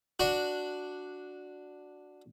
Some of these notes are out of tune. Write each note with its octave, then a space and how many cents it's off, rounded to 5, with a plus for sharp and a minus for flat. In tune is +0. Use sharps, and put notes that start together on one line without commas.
D4 +0 F#4 -5